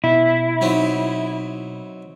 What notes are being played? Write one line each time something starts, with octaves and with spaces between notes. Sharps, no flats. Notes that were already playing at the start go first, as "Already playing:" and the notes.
B2 E4
F#3 C4 D#4